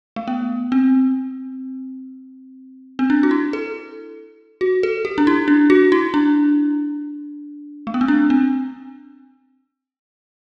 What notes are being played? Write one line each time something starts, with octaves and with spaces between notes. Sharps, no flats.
A3
B3
C4
C4
D4
F#4
E4
A4
F#4
A4
G4
D4
E4
D4
F#4
E4
D4
A3
B3
C4
D4
C4